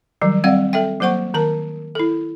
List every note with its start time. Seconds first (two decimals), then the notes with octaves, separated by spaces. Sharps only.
0.21 D#3 F#3 G3
0.44 G3 C4 D5 F5 F#5
0.73 A4 E5 G5
1.00 F#3 A#3 C5 F#5 C#6
1.34 D#3 A#4 A5
1.95 E4 A4